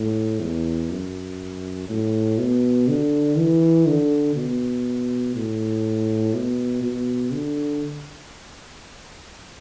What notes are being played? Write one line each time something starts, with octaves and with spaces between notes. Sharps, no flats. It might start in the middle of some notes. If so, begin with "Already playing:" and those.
Already playing: A2
E2
F#2
A2
B2
D3
E3
D3
B2
A2
B2
B2
D3